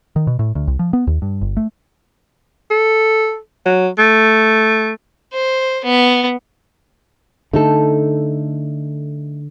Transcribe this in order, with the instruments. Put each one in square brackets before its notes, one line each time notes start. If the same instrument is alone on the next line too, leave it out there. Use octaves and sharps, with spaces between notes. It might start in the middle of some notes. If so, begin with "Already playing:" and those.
[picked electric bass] D#3
B2
A2
D2
C2
F3
B3
D#2
G2
G1
A3
[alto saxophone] A4
F#3
A3
[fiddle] C5
B3
[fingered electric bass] D3 [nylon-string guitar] A3 D#4 A4